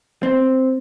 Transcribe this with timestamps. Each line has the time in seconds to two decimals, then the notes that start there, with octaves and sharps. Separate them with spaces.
0.23 C4